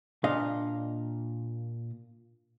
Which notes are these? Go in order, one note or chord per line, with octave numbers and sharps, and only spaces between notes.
A#2 D4 D#5 F5